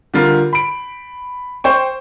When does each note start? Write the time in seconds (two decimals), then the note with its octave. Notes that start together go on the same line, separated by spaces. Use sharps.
0.14 D3 G3 F4 A#4
0.53 B5 D7
1.64 C5 G5 C#6